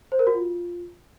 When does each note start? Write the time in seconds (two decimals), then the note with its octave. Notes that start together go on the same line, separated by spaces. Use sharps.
0.12 C5
0.19 A#4
0.27 F#4
0.34 F4